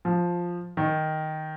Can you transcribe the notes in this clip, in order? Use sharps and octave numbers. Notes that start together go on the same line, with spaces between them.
F3
D#3